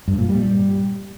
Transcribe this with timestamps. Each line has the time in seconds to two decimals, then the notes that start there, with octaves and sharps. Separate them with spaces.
0.08 G2
0.18 A#2
0.29 G3